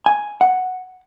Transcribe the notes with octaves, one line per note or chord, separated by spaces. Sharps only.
G#5
F#5